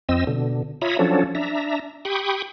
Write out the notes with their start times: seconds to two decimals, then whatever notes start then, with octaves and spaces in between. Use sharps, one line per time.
0.09 F2 C4 D#5 E6
0.27 B2 D3
0.82 F4 C#5 E5 A#5 B5 D#6
0.99 F3 F#3 C#4 D4 A4
1.35 D4 E5 A#5
2.05 G4 G5 B5 C#6 D#6